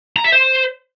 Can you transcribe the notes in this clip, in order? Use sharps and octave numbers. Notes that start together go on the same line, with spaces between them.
A#5
E5
C5